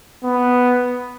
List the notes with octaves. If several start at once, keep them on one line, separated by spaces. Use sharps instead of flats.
B3